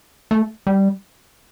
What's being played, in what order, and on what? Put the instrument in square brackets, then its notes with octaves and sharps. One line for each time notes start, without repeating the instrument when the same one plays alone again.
[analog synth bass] A3
G3